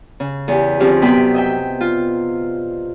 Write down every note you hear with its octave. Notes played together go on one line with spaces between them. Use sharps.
C#3
E2 G4
D3 F3 C4 C#4 G4 G#4
F#2 C3 B3 D5 G5 B5
D#5 E5 G5
F4